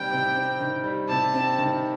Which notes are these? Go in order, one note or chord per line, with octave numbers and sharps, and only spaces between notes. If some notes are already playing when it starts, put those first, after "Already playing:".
Already playing: C3 D#3 G3 C4 G5
C3
C4
D#3
G3
C3 A5
C4
D#3